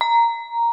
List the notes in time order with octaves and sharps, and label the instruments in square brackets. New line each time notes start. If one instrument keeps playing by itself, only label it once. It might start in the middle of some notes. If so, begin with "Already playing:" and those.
[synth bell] A#5